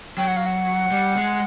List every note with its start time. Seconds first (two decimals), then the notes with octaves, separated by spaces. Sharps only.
0.18 F#3 G5
0.28 F#5
0.37 F5
0.46 F#5
0.91 G3
1.16 G#3